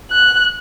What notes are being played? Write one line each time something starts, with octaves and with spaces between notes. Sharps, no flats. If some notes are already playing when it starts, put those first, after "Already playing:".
F#6